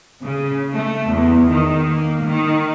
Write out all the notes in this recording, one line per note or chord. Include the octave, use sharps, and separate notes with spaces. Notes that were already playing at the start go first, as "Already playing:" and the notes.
C#3
A3
E2
D#3
A#3
D#3